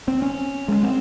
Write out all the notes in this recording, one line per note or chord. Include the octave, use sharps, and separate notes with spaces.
C4
C#4
G#3
C4